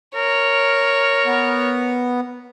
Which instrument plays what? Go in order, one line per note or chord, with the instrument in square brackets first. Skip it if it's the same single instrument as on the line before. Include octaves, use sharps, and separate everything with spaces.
[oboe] A#4 [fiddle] C#5
[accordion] B3